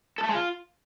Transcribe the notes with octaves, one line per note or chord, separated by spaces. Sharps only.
A4
A3
G#3
F4